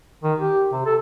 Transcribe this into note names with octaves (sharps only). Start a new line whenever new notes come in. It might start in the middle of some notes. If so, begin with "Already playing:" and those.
D#3
G4
C3
A4